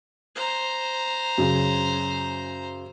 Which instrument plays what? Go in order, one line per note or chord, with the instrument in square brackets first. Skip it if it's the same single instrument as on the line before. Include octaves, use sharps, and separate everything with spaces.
[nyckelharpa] C5 A#5
[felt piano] F#2 C#3